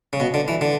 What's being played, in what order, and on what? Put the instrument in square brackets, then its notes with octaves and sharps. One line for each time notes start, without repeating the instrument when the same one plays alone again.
[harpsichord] C#3
B2
D3
E3
D3